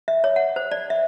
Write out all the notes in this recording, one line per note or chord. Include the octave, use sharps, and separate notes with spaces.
E5
C#5
F#5
C5
D5
E5